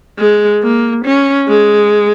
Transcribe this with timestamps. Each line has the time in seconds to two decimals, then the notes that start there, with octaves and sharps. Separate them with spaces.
0.19 G#3
0.63 A#3
1.05 C#4
1.48 G#3